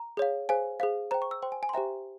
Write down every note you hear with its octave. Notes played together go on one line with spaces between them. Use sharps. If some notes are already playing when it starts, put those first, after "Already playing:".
Already playing: A#5
G#4 C#5 F5
G#4 C5 F5 G#5
G#4 C5 F5
C5 G5 A#5
C#6
E6
C5 G5 C6
G#5
G#5
C6
G4 C5 E5 G5 A#5